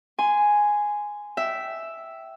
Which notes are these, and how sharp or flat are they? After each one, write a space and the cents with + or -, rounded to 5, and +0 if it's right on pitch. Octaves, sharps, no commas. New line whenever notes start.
G#5 +0 C6 -25
E5 +0 G5 -20